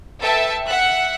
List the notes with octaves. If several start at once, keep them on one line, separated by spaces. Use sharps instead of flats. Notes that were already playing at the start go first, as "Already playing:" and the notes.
A4 B4 E5 G5 A5
E5 F#5 F#6